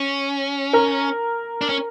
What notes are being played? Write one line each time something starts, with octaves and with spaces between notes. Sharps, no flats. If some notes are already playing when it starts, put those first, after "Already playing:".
Already playing: C#4
A#4
D4
C#4